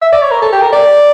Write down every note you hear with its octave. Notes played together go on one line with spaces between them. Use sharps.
E5
D5
C#5
A#4
A4
G4
A#4
D5